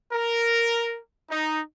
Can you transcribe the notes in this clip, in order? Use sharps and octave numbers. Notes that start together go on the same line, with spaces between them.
A#4
D#4